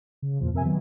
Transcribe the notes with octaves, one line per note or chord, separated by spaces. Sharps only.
C#3
E2 A#2 F3
F2 C3 A#4 E5 G#5
D#3 F#3 B3